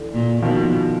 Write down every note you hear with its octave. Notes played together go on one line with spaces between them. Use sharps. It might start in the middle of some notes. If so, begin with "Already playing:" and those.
Already playing: D3 E3
A#2
B2 D#3 F3